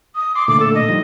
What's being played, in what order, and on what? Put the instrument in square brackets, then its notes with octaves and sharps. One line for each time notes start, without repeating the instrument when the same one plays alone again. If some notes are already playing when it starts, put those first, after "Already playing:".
[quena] D#6
[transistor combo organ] C6 [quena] D6
[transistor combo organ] A#2 D3 A3 [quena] D6
[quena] A4
D#5
[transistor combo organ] F3 G3 D#4